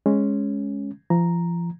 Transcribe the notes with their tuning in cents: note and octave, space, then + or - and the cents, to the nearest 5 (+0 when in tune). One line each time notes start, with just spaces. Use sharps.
G#3 +0 C#4 +0
F3 -30 A#5 +0